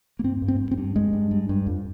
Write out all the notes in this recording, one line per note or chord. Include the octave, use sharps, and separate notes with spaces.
A#3
G2 C4
G2
C4
G2
C4
G2
G2 G#3
G2
G2
G2
F2